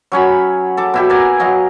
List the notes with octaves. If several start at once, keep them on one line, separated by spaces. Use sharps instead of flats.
F#3 C#4 C#5 B5
A4 D6
B2 E4 G4
A#4 D5 G#5 A#5
F#3 D#5 F5